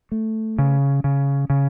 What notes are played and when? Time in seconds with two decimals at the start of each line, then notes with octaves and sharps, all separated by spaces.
0.12 A3
0.59 C#3
1.04 C#3
1.50 C#3